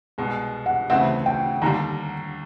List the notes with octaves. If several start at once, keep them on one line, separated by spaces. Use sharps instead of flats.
C2 B2 G#3
F#5
D2 C#3 E3 A3 C4 F#5
G5
D#2 D3 G3 A#5